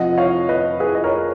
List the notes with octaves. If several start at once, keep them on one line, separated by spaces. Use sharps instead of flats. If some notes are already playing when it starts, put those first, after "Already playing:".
Already playing: F1 F2 F3 D#5 F#5
C#5 F5
B4 D#5
G#4 B4
D#5
A#4 C#5